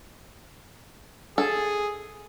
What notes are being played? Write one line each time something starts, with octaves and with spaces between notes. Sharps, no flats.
G#4 A4